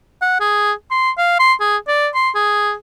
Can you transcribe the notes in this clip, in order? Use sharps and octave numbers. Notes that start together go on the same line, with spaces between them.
F#5
G#4
C6
F5
C6
G#4
D5
C6
G#4